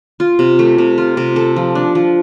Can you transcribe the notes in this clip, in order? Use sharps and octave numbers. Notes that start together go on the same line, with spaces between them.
F4
C3
A3
C3
F4
C3
A4
F3
D4
F3